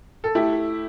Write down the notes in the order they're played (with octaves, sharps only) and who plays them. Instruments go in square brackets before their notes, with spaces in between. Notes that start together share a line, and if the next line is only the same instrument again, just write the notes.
[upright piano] A4
A3 E4 G4